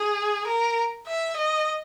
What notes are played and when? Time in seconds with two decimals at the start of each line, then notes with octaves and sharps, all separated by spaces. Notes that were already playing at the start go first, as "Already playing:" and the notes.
Already playing: G#4
0.48 A#4
1.07 E5
1.37 D#5